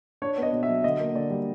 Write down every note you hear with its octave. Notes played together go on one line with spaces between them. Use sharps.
D4 C#5
B3
D#5
B2
E5
F#3
D3 D#5
A#3
D3 D5
G3